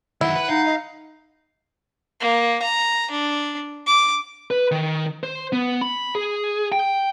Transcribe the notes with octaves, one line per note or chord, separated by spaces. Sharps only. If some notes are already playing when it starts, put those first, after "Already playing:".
F#2 D#3 E4 F#5
B4
D#4 F5
D#5
A#3
A#5
D4
D6
B4
D#3
C5
B3
B5
G#4
G5